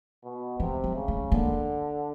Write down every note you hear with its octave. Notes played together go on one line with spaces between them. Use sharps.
B2
C3 E3
F#3
C#3
A3
D3 A#3